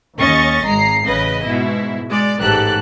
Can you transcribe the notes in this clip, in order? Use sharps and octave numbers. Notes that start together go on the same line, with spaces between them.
D#2 C#4 D#5 C#6 A6
G#1 G#3 A#5 C7
A1 C#3 B4 D#5
G#2 B2 E4
G#3 D5
A1 G#2 G4 A4 F#6